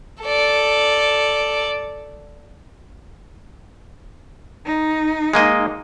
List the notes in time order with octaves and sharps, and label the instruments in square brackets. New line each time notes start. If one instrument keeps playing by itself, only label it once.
[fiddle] A4 D5
[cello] D#4
[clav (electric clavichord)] G#3 A#3 D#5